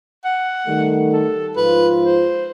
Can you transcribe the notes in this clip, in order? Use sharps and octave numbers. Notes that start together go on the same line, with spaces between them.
F#5
D#3 G3 A3
A4
G#2 F3 F4 B4
C5